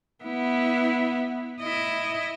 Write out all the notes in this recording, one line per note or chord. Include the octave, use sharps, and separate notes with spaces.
B3 E4
E4 D#5